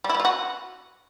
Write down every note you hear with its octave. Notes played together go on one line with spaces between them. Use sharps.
G3
E4
G3
F4
F#4